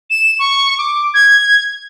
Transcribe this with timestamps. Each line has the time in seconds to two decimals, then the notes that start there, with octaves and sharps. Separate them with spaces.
0.10 E7
0.39 C#6
0.78 D6
1.14 G#6